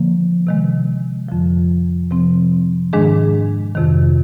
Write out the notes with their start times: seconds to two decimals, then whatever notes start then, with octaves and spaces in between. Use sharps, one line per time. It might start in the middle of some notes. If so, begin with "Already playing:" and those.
Already playing: D3 F3 A#3
0.47 C3 D#3 G#3
1.29 F2 D3 F3
2.11 C3 F3 C4
2.93 G#2 D#3 G#3 D4 G#4
3.75 F2 C3 D#3